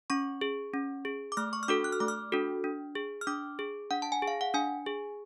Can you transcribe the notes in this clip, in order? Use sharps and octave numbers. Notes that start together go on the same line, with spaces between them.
C#4 C#6
G#4
C#4
G#4
D6
A3 F6
C#6
F6
D4 F#4 A4 D6
F#6
F6
A3 D6
F6
D4 F#4 A4
D4
G#4
F6
D4 D6
G#4
D4 F#5
A5
G#5
G#4
F5
F#5
D4 G#5
G#4